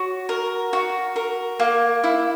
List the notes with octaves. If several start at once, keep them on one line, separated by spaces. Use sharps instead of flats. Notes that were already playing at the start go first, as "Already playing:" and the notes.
Already playing: F#4 C#5
A#4
F#4
A#4
A#3
E4